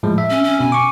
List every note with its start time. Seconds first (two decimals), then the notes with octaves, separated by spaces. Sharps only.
0.03 A2 F3 G#3
0.18 E5
0.30 C#4
0.44 C#4
0.60 B2 G#5
0.72 C#6 D6